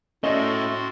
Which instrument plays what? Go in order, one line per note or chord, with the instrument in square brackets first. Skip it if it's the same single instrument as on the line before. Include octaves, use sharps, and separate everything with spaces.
[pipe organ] A2 F#4 C6 [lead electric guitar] A3 E4 [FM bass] C#4 [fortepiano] D#5